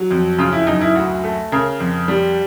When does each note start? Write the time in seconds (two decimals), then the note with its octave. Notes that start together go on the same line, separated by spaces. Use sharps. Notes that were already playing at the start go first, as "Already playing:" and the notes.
Already playing: F#3
0.11 F2
0.38 C#3 F4
0.52 E4
0.67 F#2 D#4
0.81 E4
0.95 D2 F#4
1.24 A3
1.52 C#3 A#4
1.80 F2
2.08 G3